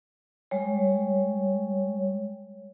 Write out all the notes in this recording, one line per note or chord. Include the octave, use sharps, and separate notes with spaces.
G3 G#3 C#5